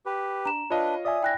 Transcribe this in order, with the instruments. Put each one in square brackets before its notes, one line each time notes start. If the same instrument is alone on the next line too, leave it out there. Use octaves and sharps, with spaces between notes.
[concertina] G4 B4
[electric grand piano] D4 [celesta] A#5 E7
[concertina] D4 B4 [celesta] F4 [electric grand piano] C#5 D#5 F5
[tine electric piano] D5 E5 G#5 [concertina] D#6
[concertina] E4 [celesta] G5 F#6 A#6